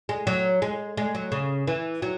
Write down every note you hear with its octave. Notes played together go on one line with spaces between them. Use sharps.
G#3
F#3
G#3
G#3
F#3
C#3
E3
F#3